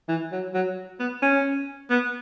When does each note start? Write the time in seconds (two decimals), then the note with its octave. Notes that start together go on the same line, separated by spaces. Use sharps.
0.09 E3
0.32 F#3
0.54 F#3
1.00 B3
1.22 C#4
1.90 B3